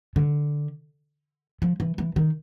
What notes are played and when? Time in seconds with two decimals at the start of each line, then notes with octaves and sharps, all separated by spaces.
0.16 D3
1.62 F3
1.80 E3
1.98 E3
2.16 D#3